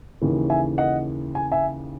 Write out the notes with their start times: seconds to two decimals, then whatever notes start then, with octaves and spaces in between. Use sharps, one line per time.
0.21 D#2 C#3 E3
0.50 E5 G#5
0.78 D#5 F#5
1.35 G#5
1.52 E5 G#5